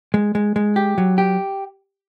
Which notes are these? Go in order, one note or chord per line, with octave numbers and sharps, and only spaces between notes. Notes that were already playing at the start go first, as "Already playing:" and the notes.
G#3
G#3
G#3
G4
F#3
G4